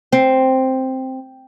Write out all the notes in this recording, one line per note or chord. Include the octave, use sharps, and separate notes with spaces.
C4